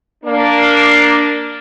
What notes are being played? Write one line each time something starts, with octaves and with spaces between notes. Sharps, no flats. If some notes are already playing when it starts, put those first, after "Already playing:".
A#3 D4